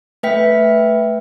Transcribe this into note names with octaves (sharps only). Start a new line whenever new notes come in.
A3 B4 E5 G5 B6